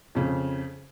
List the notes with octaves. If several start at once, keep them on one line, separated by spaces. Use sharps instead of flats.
F2 C#3